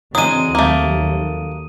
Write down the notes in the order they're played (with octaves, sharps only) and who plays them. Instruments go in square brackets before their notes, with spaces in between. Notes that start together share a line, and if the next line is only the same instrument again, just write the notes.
[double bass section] D3 E3 C4 [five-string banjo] F#3 G#3 [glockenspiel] D#6 D#7
[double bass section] D#2 F#3 [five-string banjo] A3 A#3